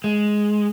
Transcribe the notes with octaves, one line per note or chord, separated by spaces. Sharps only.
G#3